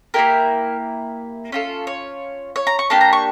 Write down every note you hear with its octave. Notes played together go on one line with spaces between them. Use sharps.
A#3 E4 G4 A#4
C#4 F4 A4
C#5
C#5
A#5
C#6
A#3 D4 G4 A5
A#5
C#6